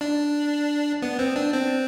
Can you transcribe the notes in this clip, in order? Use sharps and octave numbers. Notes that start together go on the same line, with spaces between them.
D4
B3
C4
D4
C4